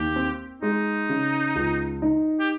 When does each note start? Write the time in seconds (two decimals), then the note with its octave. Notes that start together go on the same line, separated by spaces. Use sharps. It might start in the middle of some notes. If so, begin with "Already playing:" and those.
Already playing: D#2 G4
0.16 C4
0.62 G#3 D#4
1.09 C#3
1.55 C#2
2.02 D#4
2.40 G4